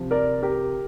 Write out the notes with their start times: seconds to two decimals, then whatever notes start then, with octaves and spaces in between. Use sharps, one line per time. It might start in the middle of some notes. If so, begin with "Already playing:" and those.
Already playing: C3 F3
0.11 A#4 D5
0.42 G4 A#4